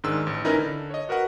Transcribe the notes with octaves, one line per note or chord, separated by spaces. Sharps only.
G#2 D#3 G#3 D4 E6
A1
C#4 D#4 E4 A#4 B4 D#5
D3
C#5 D#5
F#4 A#4 B4 F#5